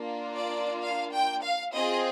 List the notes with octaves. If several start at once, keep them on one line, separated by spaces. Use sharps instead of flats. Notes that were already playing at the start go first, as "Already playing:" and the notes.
Already playing: A#3 D4 F4
D5
F5
G5
F5
C4 F4 G#4 D#5